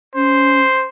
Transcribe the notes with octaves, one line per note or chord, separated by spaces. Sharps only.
C#4 C5